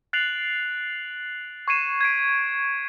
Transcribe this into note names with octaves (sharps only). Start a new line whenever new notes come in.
F#6 A6 C7 D7 F7 F#7
C#6 G#6 C7 C#7 D#7 E7
G#6 B6 D7